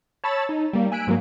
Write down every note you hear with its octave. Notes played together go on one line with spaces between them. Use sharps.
C#5 A5 B5 E6 A6
D#4
G3 A#3
G#5 E6 F#6 B6 D7
G#2 F#3 A#3